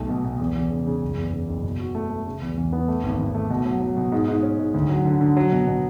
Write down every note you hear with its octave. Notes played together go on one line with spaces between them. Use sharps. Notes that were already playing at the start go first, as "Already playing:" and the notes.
Already playing: B1 A3
B2
B2
E2
E2
C#3
C#3
F#1
E2
C#3
F#1
B2
F#4
A3
A3
C#3
E2
E2
B3
A3
G#1
G#1
A3
B2
F#3
F#3
B2
G#2
G#2
C#4
G#2
D2
F#3
D3
D3
F#3
B2
B2